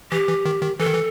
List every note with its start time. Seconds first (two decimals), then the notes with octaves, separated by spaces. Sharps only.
0.12 E3 G4
0.28 E3
0.45 D#3
0.63 D#3
0.79 E3 A4
0.87 D#3
0.94 E3